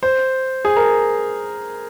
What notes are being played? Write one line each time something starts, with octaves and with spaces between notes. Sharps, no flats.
C5
G#4
A#4